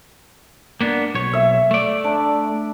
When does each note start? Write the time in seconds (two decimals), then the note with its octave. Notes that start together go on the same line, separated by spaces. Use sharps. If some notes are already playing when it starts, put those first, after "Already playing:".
0.81 A#3 B3 D4
1.15 B1 C#5
1.33 E5
1.71 A3 D5
2.04 D4